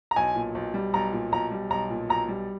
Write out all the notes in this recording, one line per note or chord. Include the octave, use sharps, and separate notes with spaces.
A#5
B1 G#5
A#2
B1
G3
B1 A#5
A#2
B1 A#5
G3
B1 A#5
A#2
B1 A#5
G3